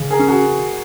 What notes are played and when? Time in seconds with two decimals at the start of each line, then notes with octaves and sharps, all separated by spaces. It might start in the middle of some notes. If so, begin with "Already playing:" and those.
Already playing: C#3
0.11 G#4 A#4
0.19 C#4
0.28 F#4 G#4